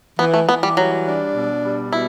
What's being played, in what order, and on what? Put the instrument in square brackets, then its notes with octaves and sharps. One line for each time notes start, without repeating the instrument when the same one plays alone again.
[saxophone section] E3 [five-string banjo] B3
[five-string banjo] A3
[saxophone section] E3 [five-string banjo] B3
[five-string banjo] G3
[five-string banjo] F#3 [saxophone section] G3
[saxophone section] D4
B2
G3
[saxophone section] B2 [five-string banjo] E4